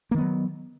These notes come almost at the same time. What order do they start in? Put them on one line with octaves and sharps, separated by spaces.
A#3 D#3 B3 F#3